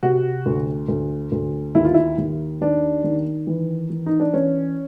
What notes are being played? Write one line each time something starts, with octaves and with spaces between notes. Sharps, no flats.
C3 F#4
D2
D2
D2
D#2 E4
F4
E4
D#2
D#3 D4
D#3
E3
E3
D#4
D4
E3 C#4